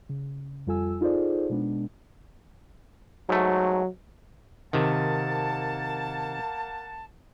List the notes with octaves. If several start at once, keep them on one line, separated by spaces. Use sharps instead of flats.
C#3
F2 G3 F4 A4 G#5 E6
D#4 F4 G#4 A4 C5 D5
B2 G#3 B3 D4
G#2 F#3 A3
C3 D#3 A#3 F#5 A5